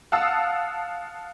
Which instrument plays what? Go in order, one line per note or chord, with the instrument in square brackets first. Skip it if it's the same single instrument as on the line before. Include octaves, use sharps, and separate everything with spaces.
[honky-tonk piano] F5 F#5 A5 D#6 E6